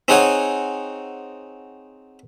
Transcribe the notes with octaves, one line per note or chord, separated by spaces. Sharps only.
C4 D#4 G#4 C#5 F#5 G#5